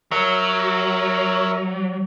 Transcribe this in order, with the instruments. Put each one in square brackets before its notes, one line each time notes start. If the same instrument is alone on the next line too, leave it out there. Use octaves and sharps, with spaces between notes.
[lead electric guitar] F#3 [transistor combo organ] A#4 C#5 E5